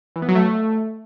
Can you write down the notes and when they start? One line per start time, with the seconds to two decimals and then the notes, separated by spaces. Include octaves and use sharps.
0.16 E3
0.22 B3
0.29 F#3
0.35 A3